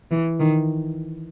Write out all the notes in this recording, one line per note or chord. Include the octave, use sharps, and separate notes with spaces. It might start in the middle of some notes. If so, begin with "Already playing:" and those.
E3
D#3